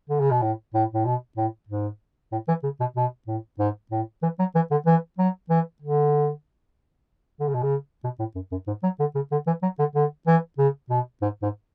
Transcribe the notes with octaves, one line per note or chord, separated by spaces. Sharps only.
D3
C#3
B2
A2
A2
A2
B2
A2
G#2
A2
E3
C#3
B2
B2
A2
G#2
A2
E3
F#3
E3
D3
E3
F#3
E3
D3
D3
C#3
B2
C#3
B2
A2
F#2
F#2
G#2
F#3
D3
C#3
D3
E3
F#3
D3
D3
E3
C#3
B2
G#2
G#2